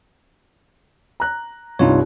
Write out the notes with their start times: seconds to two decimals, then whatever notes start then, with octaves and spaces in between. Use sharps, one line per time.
1.20 A#5 F#6
1.79 C2 G2 D#4 F4 C#5